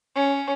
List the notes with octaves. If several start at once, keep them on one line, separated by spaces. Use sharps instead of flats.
C#4